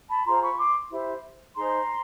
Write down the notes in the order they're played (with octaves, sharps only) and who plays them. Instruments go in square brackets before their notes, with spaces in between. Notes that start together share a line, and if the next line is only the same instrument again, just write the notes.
[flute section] A5 B5
F4 G#4 C5 A#5 C6
B5 C#6
C6 D6
E4 G4 C5
D#4 G#4 C5 A#5 C6